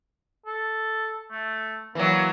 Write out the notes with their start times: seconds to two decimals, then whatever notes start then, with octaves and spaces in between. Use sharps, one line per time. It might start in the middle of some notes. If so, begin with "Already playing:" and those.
0.46 A4
1.31 A3
1.95 E3 F#3 A#3